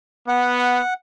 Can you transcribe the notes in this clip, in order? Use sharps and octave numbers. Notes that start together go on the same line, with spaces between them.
B3 F#5